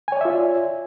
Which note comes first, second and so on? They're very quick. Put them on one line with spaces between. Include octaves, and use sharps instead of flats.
G#5 C#5 D5 E5 F4